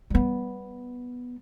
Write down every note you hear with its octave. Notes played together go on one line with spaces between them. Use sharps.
G3 B3